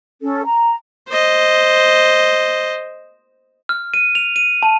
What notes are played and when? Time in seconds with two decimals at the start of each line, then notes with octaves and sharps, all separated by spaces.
0.23 C#4 A4
0.46 A#5
1.09 C5 D#5
3.69 F6
3.94 D#7
4.15 F7
4.36 D#7
4.63 A5